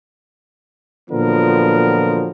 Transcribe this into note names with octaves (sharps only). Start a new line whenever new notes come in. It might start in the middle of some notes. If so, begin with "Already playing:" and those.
A#2 D3 F3 F#3 B3 A#4